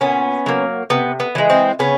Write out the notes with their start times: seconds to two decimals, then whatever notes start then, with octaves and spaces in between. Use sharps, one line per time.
0.01 A#2 B3 C#4
0.46 F#3 A#3
0.90 C3 B3
1.20 B3
1.35 E3 G#3
1.50 C4
1.79 C#3 B3 C#4